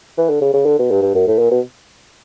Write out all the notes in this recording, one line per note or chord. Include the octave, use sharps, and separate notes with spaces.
E3
D3
C#3
C#3
D3
B2
G2
G2
F#2
A2
A#2
B2